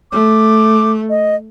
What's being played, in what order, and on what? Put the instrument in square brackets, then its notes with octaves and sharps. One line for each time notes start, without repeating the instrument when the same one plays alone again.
[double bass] A3 [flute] D6
[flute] D#5